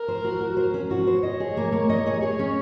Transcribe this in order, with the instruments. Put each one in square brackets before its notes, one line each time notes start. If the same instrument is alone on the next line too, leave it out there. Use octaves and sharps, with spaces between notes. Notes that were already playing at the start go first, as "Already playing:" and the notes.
Already playing: [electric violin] A#4
[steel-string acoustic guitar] C5
F#4
F#4
C5
C#4
F#4
C5
[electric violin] C#5 [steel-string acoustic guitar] D#5
[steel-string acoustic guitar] G#4
A#3
A#3
D#5
G#4
G#4
C#4